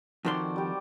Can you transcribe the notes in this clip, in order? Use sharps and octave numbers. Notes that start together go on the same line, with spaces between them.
F2 D#3 F#4 C5 D5 C6
G3 G4